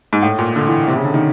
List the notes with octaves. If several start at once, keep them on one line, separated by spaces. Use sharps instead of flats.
G#2
A2
A#2
D3
E3
C3
C#3
D3
D#3